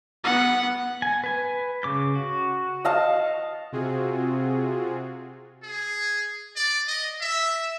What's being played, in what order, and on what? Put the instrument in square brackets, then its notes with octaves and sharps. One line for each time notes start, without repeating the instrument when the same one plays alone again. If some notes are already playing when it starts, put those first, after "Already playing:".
[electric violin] B3 F#5
[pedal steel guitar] G#5
B4 G#5
C#3 D6 G6
F#4
[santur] D#5 F5 A5
[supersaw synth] C3 C4 F4 F#4 G#4
[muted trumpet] G#4
D5
D#5
E5